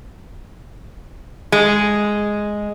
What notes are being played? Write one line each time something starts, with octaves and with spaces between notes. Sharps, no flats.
G#3